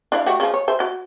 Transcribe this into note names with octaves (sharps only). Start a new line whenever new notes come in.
D4 E4 F5
A3 F#4 G4
C#3 F3
C#5
C5 E5
F#4